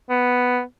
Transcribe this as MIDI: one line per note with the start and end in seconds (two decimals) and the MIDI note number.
0.10 0.61 59